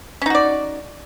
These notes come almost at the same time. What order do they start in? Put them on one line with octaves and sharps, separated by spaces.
C#4 D#4 F#4 D5